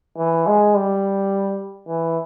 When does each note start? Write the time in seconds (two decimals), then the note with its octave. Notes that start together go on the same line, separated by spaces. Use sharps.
0.18 E3
0.47 G#3
0.75 G3
1.88 E3